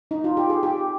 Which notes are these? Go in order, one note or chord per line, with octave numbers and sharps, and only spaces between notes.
D#4
F4
G4
G#4
G4